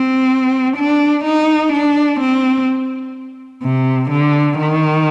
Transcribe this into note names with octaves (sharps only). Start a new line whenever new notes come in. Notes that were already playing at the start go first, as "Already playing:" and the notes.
Already playing: C4
D4
D#4
D4
C4
C3
D3
D#3